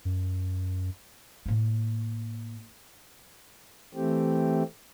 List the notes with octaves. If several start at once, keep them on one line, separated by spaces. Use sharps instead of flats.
F#2
A2 A#3
E3 A3 C4 G4